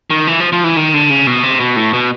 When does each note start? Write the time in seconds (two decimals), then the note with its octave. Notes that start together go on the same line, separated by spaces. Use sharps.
0.10 D#3
0.27 E3
0.40 F3
0.52 F3
0.64 E3
0.77 D#3
0.94 D3
1.10 C#3
1.27 B2
1.43 C3
1.60 B2
1.76 A2
1.93 B2